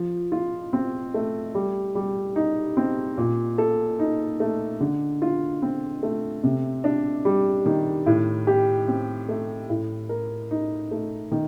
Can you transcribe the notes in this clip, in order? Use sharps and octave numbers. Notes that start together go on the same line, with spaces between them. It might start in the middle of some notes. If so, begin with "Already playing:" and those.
Already playing: F3
F4
C4
A3
G3
G3
D#4
C4
A#2
A4
D#4
A3
D3
F4
C4
A3
C3
D4
G3
D#3
A2
G4
C4
A3
A2
A#4
D#4
A3
D#3